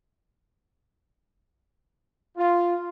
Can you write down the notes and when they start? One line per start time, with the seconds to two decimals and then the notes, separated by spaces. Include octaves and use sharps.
2.37 F4